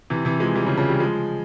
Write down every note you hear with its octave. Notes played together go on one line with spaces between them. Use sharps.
C3 E3
C3 E3
F3 G#3
E3 G3
C#3 F3
C#3 F3
E3 G3
F3 G#3